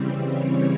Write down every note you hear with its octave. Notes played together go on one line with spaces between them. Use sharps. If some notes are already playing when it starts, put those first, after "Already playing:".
Already playing: C#3 E3 G3 C4
C#5